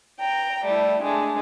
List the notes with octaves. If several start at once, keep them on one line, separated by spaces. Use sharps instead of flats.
G5 A#5
G3 A3 E4
G#3 A3 D4